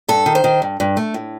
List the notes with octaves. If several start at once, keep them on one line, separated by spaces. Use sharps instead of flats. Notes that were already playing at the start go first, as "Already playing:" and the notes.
G2 A4
D#3
C5
D#3
G2
G2
A3
A2